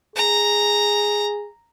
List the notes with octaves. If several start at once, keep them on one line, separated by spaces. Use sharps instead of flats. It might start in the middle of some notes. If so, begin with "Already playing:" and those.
G#4 A#5